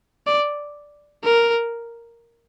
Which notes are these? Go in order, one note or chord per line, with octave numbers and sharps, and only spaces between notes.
D5
A#4